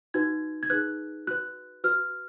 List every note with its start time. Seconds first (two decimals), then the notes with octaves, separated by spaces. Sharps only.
0.14 D#4 F#4 B4 G#6
0.63 G#6
0.70 D#4 G#4 B4 F#6
1.27 F#4 B4 F#6
1.84 F#4 B4 F6